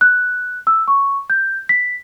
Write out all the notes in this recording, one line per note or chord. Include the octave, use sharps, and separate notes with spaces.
F#6
E6
C#6
G6
B6